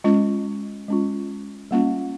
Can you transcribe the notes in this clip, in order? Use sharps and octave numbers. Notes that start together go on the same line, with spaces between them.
G#3 C#4 F4
G#3 C#4 F4
G3 A#3 C#4 F4